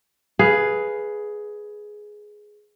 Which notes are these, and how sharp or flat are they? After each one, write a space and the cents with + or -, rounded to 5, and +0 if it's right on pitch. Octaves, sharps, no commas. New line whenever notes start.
G#4 +10 B4 +0 F5 +0